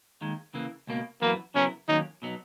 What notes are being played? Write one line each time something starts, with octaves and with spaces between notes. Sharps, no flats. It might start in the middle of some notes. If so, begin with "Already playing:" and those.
D#2 D#3 G#3
C#3 E3 A#3
C#2 B2 A#3
F#2 E3 A#3 B3 F#4 B4
C#3 F#3 B3 C#4 E4 A#4
D#2 D#3 F#3 A#3 C#4 D#4
B2 F#3 B3 D#4